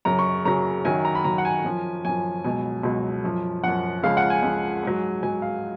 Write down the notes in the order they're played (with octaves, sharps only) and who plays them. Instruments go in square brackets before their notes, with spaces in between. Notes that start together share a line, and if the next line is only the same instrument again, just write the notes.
[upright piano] F#2 C#3 F#3 A#5
C#6
F#2 C#3 F#3 A#5
F#2 D#3 F#3 G#5
A#5
B5
F#2 D#3 F#3 A#5
F#5
G#5
F#2 F3
F#2 F3 G#5
C#2 B2 F#3 G#5
C#2 B2 F#3
F#2 F3
F#2 F3 F#5
C#2 C#3 F3 F5
F#5
G#5
C#2 C#3 F3
G#2 F#3
G#2 F#3 G#5
F5